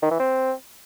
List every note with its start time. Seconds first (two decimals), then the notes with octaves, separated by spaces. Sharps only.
0.02 D#3
0.11 E3
0.19 C4